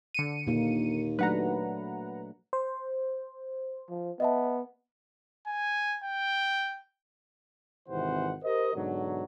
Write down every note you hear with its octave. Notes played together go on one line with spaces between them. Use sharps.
D3 C#7 D#7
D#2 A#2 A#3
F#3 A3 D4 B4 F#5 A#5
C5
F3
B3 D#5 E5 A5
G#5
G5
G#1 C3 E3 C5 F#5
G4 A#4 C5 D#5
G#2 B2 D3 F#3